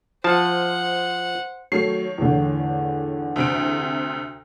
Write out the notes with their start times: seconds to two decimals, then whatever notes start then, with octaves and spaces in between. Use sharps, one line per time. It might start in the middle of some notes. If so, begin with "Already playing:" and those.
0.24 F3 C5 F#5 A5
1.72 D#3 F#3 A3 C#5 C7
2.18 E2 A2 D3
3.36 D2 C3 D7